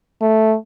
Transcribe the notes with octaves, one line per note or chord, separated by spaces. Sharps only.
A3